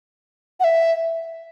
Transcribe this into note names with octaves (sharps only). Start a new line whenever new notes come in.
F#5
E5